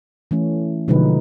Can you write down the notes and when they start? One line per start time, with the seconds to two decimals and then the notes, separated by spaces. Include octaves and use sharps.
0.31 E3 A3 C#4
0.88 B2 D3 F3 G#3 D#4 B4